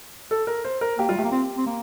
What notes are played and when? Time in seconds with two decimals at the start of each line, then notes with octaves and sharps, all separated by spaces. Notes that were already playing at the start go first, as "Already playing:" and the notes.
0.31 A4
0.47 A#4
0.64 C5
0.81 A#4
0.98 A#3 G4
1.09 G3 F4
1.17 A3 G4
1.24 A#3
1.32 C4
1.58 C4
1.66 A#3